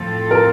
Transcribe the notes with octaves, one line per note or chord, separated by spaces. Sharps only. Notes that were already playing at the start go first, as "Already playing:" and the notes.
Already playing: A2 F3 C4 F4 A4
A#4